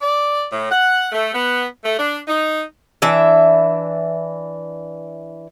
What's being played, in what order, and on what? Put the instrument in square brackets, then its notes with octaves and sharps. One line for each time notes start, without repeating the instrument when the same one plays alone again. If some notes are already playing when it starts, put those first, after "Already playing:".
[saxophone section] D5
A2
F#5
A3
B3
A3
D4
D#4
[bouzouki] E3 D4 E5